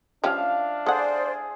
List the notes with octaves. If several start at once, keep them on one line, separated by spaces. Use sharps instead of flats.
F3 C#4 D4 G4 E5 F5
G#4 A4 C5 D5 F#5